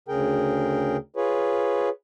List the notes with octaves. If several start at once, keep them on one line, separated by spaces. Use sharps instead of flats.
D2 C#3 G#4 A#4 G5
F4 G#4 B4 C#5